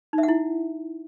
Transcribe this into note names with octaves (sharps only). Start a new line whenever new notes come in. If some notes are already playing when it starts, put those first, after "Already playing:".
D#4
E5
F#5
E4